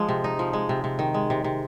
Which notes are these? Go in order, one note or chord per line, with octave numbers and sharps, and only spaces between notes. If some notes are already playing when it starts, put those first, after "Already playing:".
Already playing: F3 G#3
C3
D#4
F3
G#3
C3
C3
D#3
G#3
C3
C3